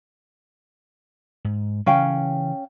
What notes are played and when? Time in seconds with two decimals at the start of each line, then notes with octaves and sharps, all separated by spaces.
1.45 G#2
1.86 C#3 E3 C#4 F5 G5